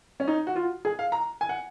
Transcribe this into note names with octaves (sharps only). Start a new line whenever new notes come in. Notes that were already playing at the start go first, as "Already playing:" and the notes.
C#4
D#4
F#4
F4
G#4
F5
A#5
G#5
F#5